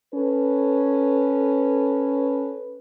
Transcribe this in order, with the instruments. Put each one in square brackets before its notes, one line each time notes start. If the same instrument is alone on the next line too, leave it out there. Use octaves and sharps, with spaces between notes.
[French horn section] C#4 A4 B4